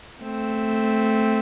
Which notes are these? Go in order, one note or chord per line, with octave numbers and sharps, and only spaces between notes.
A3 C4